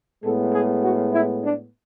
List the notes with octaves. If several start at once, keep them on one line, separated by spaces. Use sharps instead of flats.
A2 G#3 B3 A4
G#4
F#4
E4
D4